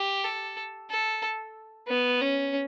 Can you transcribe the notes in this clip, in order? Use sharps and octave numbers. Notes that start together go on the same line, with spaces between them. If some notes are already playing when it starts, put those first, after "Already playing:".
Already playing: G4
A4
A4
B3
C#4